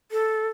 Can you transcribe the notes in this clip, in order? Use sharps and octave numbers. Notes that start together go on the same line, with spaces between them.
A4